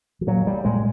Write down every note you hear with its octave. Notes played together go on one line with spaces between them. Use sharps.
F3
A#2 F#3
A#2 G3
A#2 G#3